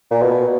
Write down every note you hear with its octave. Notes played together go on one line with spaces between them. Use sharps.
A#2
B2